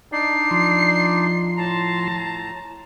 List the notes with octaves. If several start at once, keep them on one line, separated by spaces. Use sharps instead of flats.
D4 D#4 D5 C7
F3 C6
A2 A5 A#5